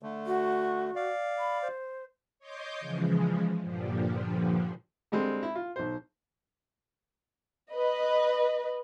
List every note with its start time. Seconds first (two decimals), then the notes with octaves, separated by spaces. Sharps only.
0.03 D3 A3
0.26 F#4
0.96 D5 F5
1.38 B5
1.62 C5
2.39 C#5 D#5 C6 D6 G6
2.80 C#3 E3 F3 G#3
3.61 G2 A#2 D3 F3 G3
5.12 D3 G3 G#3 C4
5.43 E4
5.55 F4
5.76 B1 C5
7.71 B4 D#5